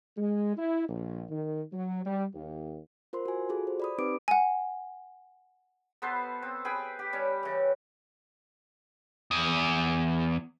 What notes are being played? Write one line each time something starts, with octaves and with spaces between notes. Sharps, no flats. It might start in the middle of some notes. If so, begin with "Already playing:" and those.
G#3
E4
A#1
D#3
F#3
G3
D#2
F4 A#4 C5 C6
F#4 G#5
F4 F#4 G#4 A4
C5
D5 B5 D#6
C4 D#4 G4 B4 D6 D7
F#5 G#5
B3 A4 B4 C5
C4
G#4 B4 G5
G4
G3 C#4
C#3 E3
E2